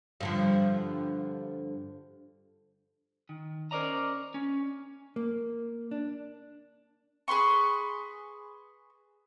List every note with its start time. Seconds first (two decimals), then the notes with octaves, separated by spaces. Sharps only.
0.20 G2 D3 F3
3.29 D#3
3.71 C#4 A#4 C5 D5 D#5 A#5
4.34 C#4
5.16 A#3
5.91 D4
7.28 G#4 B4 C6 C#6